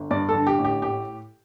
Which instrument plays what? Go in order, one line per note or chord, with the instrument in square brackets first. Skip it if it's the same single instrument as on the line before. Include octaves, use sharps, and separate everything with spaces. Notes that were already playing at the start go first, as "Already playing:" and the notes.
Already playing: [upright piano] G1
G2 D5
A4
D3
G4
A1
G4
A2 G4